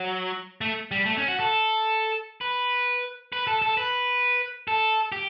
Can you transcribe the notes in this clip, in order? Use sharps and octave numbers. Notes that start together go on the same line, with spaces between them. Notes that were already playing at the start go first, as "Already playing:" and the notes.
Already playing: F#3
A3
G3
A3
C#4
F#4
A4
B4
B4
A4
A4
B4
A4
G4